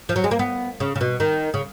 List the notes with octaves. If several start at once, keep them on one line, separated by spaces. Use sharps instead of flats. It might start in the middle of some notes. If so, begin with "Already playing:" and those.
F3
F#3
G#3
A#3
B3
C#3
C#3
B2
D#3
C#3